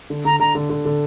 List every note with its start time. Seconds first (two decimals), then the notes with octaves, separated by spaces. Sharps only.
0.10 D3
0.25 D3 A#5
0.40 D3 A#5
0.55 D3
0.70 D3
0.85 D3